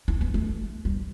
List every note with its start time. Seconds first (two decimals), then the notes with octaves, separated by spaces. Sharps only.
0.08 E4
0.21 B3
0.34 A3
0.85 G3